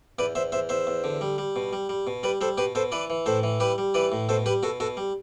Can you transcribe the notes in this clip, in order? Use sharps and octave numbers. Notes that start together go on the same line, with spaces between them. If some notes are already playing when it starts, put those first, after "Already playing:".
E2 B4 D5
E2 C5 E5
E2 C5 E5
E2 C5 E5
E2
D3
G3
G3
B2
G3
G3
B2
G3 B4 D5
G3 A4 C5
B2 G4 B4
B2 A4 C5
E3 B4 D5
E3
A2 A4 C5
E3
G3 G4 B4
G3
E3 B4 D5
A2
B2 A4 C5
G3 G4 B4
B2 F#4 A4
B2 F#4 A4
G3